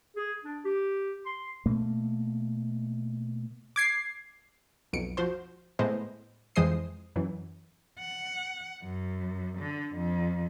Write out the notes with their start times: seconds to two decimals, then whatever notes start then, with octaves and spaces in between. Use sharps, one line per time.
0.16 G#4
0.44 D4
0.65 G4
1.26 C6
1.66 B2 A3 A#3
3.76 D6 G#6 C7
4.93 B1 F2 C#7 D7
5.17 F3 F#4 C5 C6
5.79 A2 G#3 B3 C5 D#5
6.56 F2 E3 G#3 C5 D#6 C7
7.16 F#2 E3
7.99 F#5
8.83 F#2
9.59 D3
9.96 F2